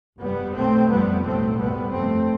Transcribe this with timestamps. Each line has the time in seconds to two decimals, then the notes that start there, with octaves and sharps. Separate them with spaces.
0.20 G1 F2 C3 G3 B3
0.55 B1 B2 A3 C4
0.89 G1 F2 C3 G3 B3
1.24 B1 A2 A3 C4
1.58 C2 B2 G3 B3
1.93 G1 F2 C3 A3 C4